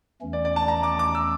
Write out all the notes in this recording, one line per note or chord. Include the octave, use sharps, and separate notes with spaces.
E2 E3 A3 C#4
D5
D5
A5
A#5
D6
D6
E6